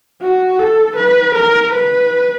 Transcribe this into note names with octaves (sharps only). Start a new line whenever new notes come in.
F#4
A4
B4
A#4
B4